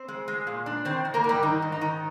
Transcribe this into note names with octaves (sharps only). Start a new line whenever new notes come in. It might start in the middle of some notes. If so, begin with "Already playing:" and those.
Already playing: C4 C5
G#3
G#3
A#2
D4
D#3 C4 C5
D#3
A#3 A#4
G#2
G3 G4
D#3 D#4
G#2
D#4
D#3